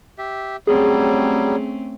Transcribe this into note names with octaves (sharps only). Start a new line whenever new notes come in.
G4 E5
F#3 G3 A3 C4 C#4 G#4